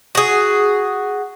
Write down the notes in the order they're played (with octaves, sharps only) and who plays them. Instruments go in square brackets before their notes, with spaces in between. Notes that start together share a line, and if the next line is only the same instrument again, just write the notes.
[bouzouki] F#4 G#4